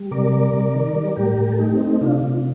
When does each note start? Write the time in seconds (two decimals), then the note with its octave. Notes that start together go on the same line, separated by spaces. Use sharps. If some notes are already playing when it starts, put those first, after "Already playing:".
Already playing: G3
0.11 C3 A#4 D5
0.32 G3 A#4 D5
0.54 C3
0.74 D#3
0.96 G3
1.16 A2 G4 A#4
1.38 A2
1.52 A4
1.59 A3 D#4 G4
1.74 C4 D#4
1.81 A3
1.87 C4 D#4
2.01 C3 D4 F4
2.23 C3